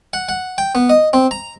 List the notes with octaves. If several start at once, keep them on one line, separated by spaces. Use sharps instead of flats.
F#5
F#5
G5
B3
D#5
C4
A#5